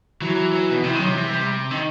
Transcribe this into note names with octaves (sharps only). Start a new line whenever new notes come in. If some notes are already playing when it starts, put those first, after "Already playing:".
E3 F#3
F#3
F#3
B2
C3 E3
D#3
C3 F#3
E3
G3
D#3